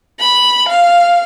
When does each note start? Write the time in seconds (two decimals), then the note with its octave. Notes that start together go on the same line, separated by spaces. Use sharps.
0.20 B5
0.69 F5